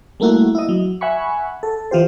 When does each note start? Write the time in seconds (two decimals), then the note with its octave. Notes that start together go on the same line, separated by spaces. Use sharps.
0.20 G3 A3 A#3 E4 F#4
0.55 E4 D#5
0.69 F#3
1.01 E5 F#5 G#5 B5 C#6
1.63 A4
1.91 E3 F4 G4 C5